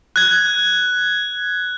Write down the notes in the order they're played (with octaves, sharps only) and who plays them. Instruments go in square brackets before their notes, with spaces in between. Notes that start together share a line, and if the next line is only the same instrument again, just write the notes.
[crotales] F#6 G#6